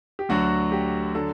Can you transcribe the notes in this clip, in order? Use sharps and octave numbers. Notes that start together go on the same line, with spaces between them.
G4
D2 D3 F#3 F#4
G4
D3 F#3 A4